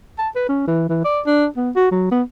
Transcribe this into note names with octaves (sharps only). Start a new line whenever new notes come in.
A5
B4
C#4
E3
E3
D5
D4
B3
F#4
F#3
B3